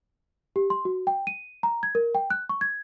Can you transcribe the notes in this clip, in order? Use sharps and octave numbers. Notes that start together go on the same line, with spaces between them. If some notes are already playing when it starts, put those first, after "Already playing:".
G4
C6
F#4
G5
D#7
A#5
G#6
A#4
G5
F#6
C#6
G#6